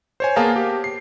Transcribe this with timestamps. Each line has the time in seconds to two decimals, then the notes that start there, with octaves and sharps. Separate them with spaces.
0.20 C5 C#5 G#5
0.36 A#3 B3 G#4 F5 A5 A#5
0.56 G4
0.84 C7